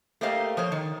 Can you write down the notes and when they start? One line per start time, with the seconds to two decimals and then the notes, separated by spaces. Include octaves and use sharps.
0.21 A3 A#3 G4 C5 D#5 F5
0.57 F3 C5 C#5
0.72 D#3